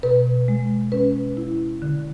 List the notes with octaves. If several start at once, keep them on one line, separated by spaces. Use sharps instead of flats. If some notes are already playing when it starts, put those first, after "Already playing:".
B2 B4
G#3
C#4 B4
E4
D3